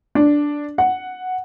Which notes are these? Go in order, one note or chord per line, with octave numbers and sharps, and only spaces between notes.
D4
F#5